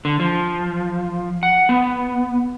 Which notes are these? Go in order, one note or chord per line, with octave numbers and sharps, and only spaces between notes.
D3
F3
F#5
B3